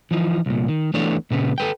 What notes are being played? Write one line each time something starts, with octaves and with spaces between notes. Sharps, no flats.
E3 F3 D#4
C2 A#2
D#3
E3 A3 B3 D4 C#5
A#2 C#3 B4
A4 B4 G5